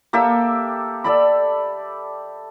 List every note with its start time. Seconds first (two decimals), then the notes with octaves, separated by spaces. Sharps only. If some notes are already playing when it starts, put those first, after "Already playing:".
0.13 A#3 G4 A4 E5
1.04 A4 D5 B5